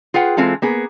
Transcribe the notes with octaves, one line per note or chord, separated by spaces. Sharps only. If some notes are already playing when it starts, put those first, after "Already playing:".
F4 G#4 B4 F#5 G5
E3 G#3 C4 F4 A4
A#3 B3 G#4